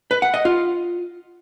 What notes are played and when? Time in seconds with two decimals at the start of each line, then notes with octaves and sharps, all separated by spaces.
0.11 B4
0.22 F#5
0.34 D#5
0.45 F4